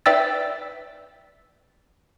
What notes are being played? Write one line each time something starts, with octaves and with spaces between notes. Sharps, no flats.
B4 D5 E5 G5 E6 A6